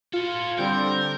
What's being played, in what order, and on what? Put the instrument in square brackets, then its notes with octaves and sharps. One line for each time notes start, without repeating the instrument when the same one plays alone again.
[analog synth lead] F4 [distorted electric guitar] A4 C#5
[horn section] D3 G3 [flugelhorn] C4 [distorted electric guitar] A#4 [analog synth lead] G6